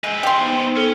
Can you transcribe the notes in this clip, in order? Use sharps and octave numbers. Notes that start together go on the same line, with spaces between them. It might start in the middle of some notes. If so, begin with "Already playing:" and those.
G#3 C4 B4
G4 C6
B3 D#4 C5
C#4 A4 G7